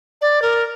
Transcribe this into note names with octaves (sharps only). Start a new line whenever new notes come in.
D5
A#4